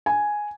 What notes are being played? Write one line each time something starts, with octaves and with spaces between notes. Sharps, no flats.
G#5